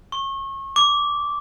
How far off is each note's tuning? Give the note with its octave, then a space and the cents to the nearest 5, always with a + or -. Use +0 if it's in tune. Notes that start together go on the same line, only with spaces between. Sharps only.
C#6 -30
D6 -10